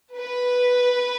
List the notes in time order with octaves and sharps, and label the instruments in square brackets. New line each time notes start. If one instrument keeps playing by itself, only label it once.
[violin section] B4